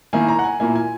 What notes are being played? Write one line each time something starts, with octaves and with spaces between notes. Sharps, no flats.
D#3 A#3 E4 G#5
A#5
F#5
G#5
A#2 A#3 E4 G#5
G#5